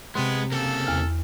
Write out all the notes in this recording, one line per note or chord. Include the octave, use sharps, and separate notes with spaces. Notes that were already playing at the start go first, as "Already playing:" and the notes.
C3 G#3 B3 C6
C#3 A#3 C4 A4
E2 F6